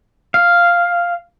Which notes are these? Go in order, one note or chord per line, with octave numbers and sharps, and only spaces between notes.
F5